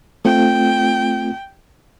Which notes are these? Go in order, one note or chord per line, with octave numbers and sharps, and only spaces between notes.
A3 C4 F4 G5